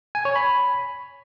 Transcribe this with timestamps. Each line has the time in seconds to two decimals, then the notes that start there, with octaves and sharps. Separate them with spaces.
0.15 G#5
0.25 C#5
0.36 B5